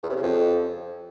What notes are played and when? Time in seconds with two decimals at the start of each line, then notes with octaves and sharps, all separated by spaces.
0.03 E2
0.09 C3
0.16 C#3
0.22 F2